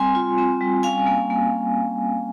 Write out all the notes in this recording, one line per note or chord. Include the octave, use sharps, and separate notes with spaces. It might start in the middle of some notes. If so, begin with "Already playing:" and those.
Already playing: G3 C4 G#5 C6
F4
C4
G3
C#4 F5 G#5
A#3
A#3